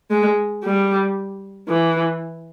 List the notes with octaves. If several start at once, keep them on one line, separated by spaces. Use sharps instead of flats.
G#3
G3
E3